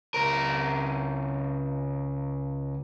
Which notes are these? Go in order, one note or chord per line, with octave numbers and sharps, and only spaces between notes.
C#2 A#4